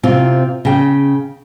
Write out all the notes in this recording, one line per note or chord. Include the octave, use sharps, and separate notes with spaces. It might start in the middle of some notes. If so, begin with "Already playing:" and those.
C3 C4 F4
C#3 G5